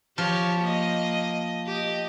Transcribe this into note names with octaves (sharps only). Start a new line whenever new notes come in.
F3 G4 C#5
A#3 D#5
G4 D#5